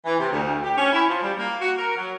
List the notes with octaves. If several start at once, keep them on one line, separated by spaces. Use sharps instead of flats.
E3
C3
D2
G4
C#4
E4
F3
G3
A#3
F#4
A#4
F#3